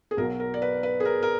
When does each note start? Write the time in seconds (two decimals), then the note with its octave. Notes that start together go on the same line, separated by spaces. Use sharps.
0.11 G#4
0.17 B1 B2 F#3 A#4
0.40 A#4
0.54 D5
0.62 B4
0.83 B4
1.00 G#4
1.05 A#4
1.22 A#4